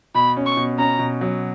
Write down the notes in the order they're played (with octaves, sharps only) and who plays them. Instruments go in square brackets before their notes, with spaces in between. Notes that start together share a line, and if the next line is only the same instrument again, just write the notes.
[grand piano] B2 [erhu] B5
[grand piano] C#4
[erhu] C#6
[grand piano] B2
[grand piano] C#4 [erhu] A#5
[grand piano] B2
F#3